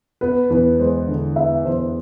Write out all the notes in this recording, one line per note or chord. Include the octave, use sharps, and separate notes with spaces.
B3 B4
E2 B4
G#3 C5
D3
B3 E5
E2 C5